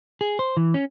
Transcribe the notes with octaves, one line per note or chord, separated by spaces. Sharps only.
G#4
C5
E3
C#4